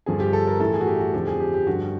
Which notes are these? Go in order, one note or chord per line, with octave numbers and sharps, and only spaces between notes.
G2 D3 F3 G#4
G4
A4
A#4
A2 E3 A4
G#4
F#4
G4
F#4
F2 D3 F3 G4
G#4
G4
G4
G2 D3 F3 F#4